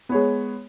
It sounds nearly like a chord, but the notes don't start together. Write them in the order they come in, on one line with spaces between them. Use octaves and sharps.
B3 C#5 G#3